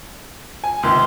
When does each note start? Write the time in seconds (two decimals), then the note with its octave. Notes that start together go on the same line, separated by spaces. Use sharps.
0.64 G#5
0.83 C#2 C3 D#3 C6